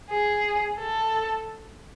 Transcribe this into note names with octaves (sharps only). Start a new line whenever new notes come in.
G#4
A4